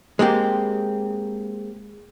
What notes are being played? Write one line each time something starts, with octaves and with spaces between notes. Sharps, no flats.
G#3 A#3 C4 G4